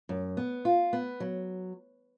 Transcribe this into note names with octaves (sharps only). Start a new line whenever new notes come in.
F#2
B3
F4
B3
F#3